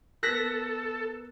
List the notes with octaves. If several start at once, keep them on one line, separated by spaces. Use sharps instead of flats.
B3 A4 A#4 F#6 A#6 B6